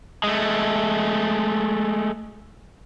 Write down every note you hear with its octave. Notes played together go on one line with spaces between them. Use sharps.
G#3 A3